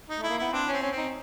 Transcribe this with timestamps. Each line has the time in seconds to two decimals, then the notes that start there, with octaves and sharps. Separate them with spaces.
0.09 D#4
0.19 A3 E4
0.30 A#3
0.38 B3 E4
0.52 C4 D4
0.68 C4 C#4
0.82 C#4
0.91 C4
0.97 D#4